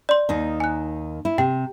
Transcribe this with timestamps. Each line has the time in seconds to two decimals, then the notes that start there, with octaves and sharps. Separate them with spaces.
0.09 D5 C6
0.29 D#2 D#3 D#4
0.60 G#5 F#6
1.25 E4
1.38 C3 G5